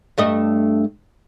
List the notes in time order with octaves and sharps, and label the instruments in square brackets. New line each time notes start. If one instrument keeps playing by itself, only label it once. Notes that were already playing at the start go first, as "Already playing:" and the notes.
[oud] G2 A3 D#5